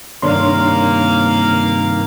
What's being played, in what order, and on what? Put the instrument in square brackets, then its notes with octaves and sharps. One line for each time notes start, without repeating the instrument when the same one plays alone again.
[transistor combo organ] G2 C3 D#3 [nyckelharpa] A#3 F5 [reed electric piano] D4 C#5 C6